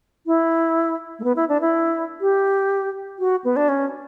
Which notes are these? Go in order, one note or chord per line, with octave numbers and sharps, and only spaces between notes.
E4
A3
B3
E4
D4
E4
G4
F#4
B3
D4
C#4